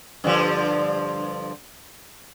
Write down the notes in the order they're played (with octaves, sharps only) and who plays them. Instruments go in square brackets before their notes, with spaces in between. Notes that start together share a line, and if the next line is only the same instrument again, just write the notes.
[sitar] G2 D3 F3